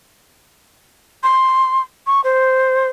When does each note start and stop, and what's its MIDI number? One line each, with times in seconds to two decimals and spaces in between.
1.23 1.82 84
2.06 2.21 85
2.24 2.88 72